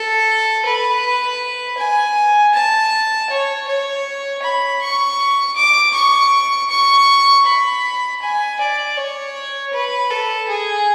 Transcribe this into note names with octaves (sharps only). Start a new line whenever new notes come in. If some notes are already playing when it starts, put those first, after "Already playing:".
Already playing: A4
B4
G#5
A5
C#5
C#5
B5
C#6
D6
C#6
C#6
B5
G#5
D5
C#5
B4
A4
G#4